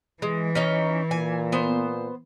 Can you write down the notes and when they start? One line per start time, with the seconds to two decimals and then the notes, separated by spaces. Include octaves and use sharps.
0.22 E3 G#3
0.55 C#4 D#4 C#5
1.11 A#2 G#5
1.52 B3 C5